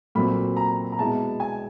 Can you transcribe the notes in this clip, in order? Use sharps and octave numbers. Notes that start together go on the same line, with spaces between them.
A#2 F#3 A3 C4 B5
A#5
A#5
B2 G#3 B3 E4 A5
G#5